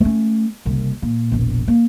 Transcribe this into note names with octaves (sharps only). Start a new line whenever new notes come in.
A3 C#4
F#1 C2
A#2
E1 A#1
A#3